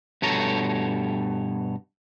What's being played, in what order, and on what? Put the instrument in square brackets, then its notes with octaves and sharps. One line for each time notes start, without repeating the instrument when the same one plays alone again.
[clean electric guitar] G2 B2 A4 C#5 A#5